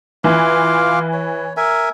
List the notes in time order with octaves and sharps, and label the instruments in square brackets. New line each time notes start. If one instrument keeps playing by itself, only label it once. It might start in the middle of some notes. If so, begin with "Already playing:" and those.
[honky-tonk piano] E3 [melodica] F4 F5 D6
[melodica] C#5
A#4 E5 G#5